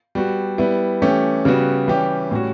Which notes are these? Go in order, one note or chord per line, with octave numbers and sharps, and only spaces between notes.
G3 B3 F#4
G3 B3 E4
E3 A3 C#4 G4
C#3 G3 B3 F#4
E3 G3 C#4 G4
A2 G3 C#4 F#4